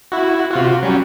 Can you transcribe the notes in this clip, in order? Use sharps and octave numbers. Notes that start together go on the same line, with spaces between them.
E4 F#4
C3 F4 F#4
F#3 G3 C#4